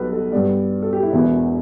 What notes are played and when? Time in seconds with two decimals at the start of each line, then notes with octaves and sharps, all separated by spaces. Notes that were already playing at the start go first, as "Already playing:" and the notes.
Already playing: B1 B2 G3 B3 A4 B4
0.12 A4
0.32 G2 G3 B3 D5
0.82 A4
0.93 G4
1.03 E4
1.13 E1 E2 B2 B3 E4